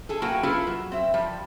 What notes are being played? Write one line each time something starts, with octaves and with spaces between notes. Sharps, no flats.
G#4 A4
F#3 A#3 E4 F#4 B4 G5
E4 F4 G#4 A4 B4
F#3
C4 E5
F3 G3